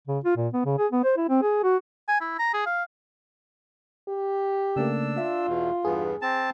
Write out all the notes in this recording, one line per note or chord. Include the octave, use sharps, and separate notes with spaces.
C#3
F4
A#2
B3
C#3
G#4
B3
C5
E4
C4
G#4
F#4
G#5
E4
A#5
G#4
F5
G4
C#3 A3 A#3 D4 E6
F4 E5
E2 B2
E2 G2 B3 G#4
C4 A5